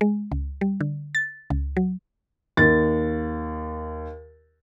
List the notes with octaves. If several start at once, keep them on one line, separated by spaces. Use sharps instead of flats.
G#3
C#2
G3
D3
A6
C#2
F#3
D#2 A6